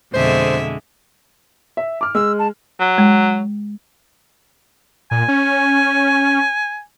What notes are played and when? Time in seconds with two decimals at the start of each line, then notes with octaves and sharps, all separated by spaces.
0.14 F2 B2 D3 G#3 C5 E5
1.77 E5
2.01 D6 F6
2.15 G#3 E6
2.39 A5
2.80 F#3
2.98 G#3
5.11 A#2 G#5
5.28 C#4